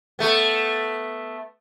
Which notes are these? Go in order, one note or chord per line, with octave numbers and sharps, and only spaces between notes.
A3 B3